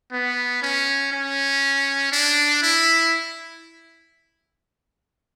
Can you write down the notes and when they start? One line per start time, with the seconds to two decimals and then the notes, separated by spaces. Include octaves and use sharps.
0.12 B3
0.62 C#4
1.12 C#4
2.12 D4
2.62 E4